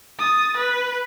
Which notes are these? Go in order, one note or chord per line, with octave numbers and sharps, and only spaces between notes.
D#6 A6
B4